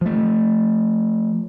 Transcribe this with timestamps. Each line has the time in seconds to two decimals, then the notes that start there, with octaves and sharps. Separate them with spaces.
0.01 F3 A3